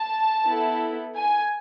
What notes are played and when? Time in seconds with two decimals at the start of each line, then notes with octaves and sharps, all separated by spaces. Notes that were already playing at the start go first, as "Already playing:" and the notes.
Already playing: A5
0.46 B3 E4 A4
1.17 G#5